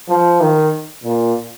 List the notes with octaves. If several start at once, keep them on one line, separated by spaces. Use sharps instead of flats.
F3
D#3
A#2